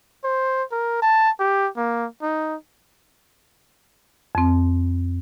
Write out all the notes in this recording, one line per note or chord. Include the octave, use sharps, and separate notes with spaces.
C5
A#4
A5
G4
A#3
D#4
F2 C4